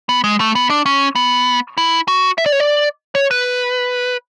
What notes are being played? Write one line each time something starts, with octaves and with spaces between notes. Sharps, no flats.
B3
G#3
A3
B3
D4
C#4
B3
E4
F#4
E5
D5
C#5
D5
C#5
B4